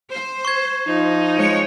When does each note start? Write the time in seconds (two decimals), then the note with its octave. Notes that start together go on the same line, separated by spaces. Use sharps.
0.11 C5
0.45 C#6 G#6
0.87 F3 D#4
1.36 G#3 C#5